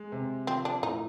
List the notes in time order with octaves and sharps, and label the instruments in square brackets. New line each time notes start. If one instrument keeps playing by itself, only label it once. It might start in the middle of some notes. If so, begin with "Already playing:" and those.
Already playing: [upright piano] G#3
C3
[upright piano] F3 [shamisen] C4
[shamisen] D4
[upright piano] A2 [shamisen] D#4